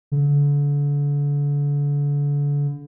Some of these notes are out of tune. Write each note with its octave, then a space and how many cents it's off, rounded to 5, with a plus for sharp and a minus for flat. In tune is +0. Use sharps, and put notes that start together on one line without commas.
D3 -35